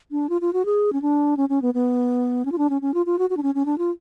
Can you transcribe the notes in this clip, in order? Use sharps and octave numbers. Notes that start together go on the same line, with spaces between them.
D4
F4
F4
F#4
G#4
C#4
D4
C#4
C#4
B3
B3
C#4
F4
D4
C#4
C#4
F4
F4
F#4
F#4
D4
C#4
C#4
D4
F4